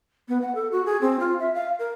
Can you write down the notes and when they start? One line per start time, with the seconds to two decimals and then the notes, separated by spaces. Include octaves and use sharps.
0.29 B3
0.42 F#5
0.55 A4
0.72 F#4
0.86 G#4
1.01 C4
1.20 F4
1.40 E5
1.54 F5
1.79 A#4